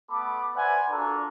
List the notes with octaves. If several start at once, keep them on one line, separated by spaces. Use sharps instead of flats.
A3 B3 A4 B5 D6
B4 C5 D5 E5 F#5 G#5
D4 F4 F#4 A4 A#4 A#5